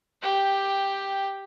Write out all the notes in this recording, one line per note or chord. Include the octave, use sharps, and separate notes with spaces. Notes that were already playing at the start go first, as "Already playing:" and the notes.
G4 G5